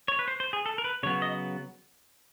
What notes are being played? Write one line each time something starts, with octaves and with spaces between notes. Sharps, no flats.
C#5
B4
C5
C5
G#4
A4
A#4
B4
C#3 F#3 B3 C#5
D#5